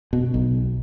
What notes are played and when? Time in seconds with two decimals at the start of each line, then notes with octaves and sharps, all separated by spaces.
0.13 B2
0.34 B1